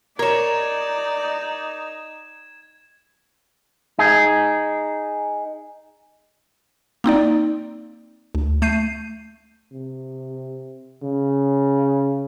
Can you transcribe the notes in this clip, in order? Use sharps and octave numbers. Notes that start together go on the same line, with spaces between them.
D#4 A#4 C#5 D5 G#6 E7
D#4 G#4
A#3 C4 D#4 D5
D2
A3 G6 C7 D#7
C3
C#3